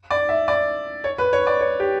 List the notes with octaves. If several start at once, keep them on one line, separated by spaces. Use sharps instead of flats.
D5
E5
D5
C#5
B4
C#5
D5
C#5
G4